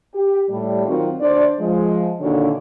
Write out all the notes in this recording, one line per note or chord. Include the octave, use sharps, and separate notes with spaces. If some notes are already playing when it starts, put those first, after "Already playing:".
G4
A2 G3
D#3 F#3 C4 F4 F#4
D2 D4 C5 D5
F3 G#3
A#2 D3 D#3 D4 F#4 C#5